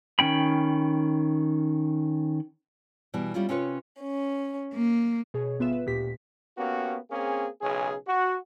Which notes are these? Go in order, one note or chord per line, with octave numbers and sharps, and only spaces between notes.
D#3 C#4 G5 B5
B2 E3 G3
G3 C#4 E4 F4
C3 C#4 F4 B4 C#5
C#4
A#3
B2 G#4 C#5
G1 B3 F4 B4 E5 E7
B4
D2 A#2 G4 B6
A#3 B3 C#4 F#4 G4
A#3 C4 C#4 G#4
B1 C#3 C#4 G#4
F#4